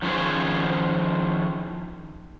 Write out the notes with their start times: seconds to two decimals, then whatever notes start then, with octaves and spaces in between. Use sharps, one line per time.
0.02 D#3 F3 C#4 G#4 C5